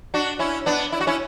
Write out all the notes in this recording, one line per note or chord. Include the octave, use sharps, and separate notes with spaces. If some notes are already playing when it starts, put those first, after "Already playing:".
D4 F#4
C#4 E4
B3 D4
E4
F#4
C#4 E4